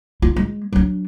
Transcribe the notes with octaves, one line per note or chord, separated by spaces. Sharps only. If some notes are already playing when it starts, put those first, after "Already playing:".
F4
G#3
F#3 D4